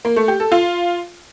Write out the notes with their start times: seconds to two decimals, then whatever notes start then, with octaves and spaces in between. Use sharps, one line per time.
0.05 A#3
0.16 A3
0.28 G4
0.40 A4
0.52 F4